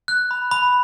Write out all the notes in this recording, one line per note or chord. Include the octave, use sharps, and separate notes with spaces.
F#6
B5
B5